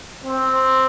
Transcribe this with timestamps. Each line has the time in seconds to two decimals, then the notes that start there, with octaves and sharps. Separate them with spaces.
0.24 C4